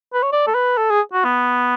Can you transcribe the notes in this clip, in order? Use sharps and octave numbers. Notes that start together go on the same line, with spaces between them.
B4
C#5
D5
A4
B4
A4
G#4
F#4
B3